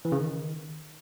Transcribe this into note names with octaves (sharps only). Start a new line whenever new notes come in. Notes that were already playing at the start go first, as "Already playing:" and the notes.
E3
C#3
D#3